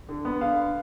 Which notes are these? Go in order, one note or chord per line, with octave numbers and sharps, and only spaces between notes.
D3
B3
D3 F5